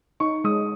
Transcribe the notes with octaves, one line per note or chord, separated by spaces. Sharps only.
D#4 C#6
G#3 D#6